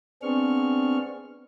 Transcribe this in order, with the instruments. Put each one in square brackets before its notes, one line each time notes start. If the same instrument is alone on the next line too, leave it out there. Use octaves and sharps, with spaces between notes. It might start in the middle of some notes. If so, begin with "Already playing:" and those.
[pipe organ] B3 C4 D4 G#4 C#6 F6